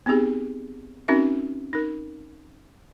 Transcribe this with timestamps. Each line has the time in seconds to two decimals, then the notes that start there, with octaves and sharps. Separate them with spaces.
0.06 B3 C4 D#4 G4 G#4
1.08 C4 C#4 D#4 F#4 A#4 E5
1.73 D#4 A#4